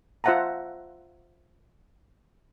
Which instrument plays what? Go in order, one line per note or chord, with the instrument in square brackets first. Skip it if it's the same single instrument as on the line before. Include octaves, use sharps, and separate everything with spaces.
[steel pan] F4 C5 E5 F#5 A5 A#5